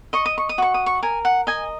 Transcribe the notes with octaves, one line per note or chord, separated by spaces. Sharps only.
D#5 C#6
D#6
C#6
D#6
F#4 C#6
D#6
C#6
A#4 G#5
F#5
D#5 G#5